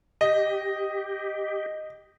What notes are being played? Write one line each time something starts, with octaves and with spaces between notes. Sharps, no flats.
G4 D#5